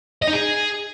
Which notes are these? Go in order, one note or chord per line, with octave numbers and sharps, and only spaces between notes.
D#5
D#4
G#4